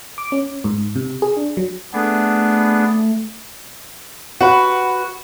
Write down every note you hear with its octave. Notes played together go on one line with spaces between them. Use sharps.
D6
C#4
G#2
C3
G#4
D4
F#3
A3 B3 D4 G#4
F#4 B4